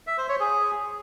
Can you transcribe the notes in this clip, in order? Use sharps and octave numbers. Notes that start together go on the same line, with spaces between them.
E5
C5
C#5
G#4